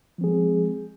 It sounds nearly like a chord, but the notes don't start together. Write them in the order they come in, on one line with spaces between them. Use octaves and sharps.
F3 C4 G#4 G#3